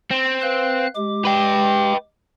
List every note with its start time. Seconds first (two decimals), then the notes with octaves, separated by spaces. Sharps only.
0.11 C4
0.42 B4 F5 F#6
0.96 G#3 G4 D6
1.25 B4 G5